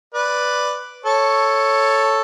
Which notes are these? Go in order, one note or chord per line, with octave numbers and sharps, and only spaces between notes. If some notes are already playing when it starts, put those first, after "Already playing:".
B4 D5
A4 C#5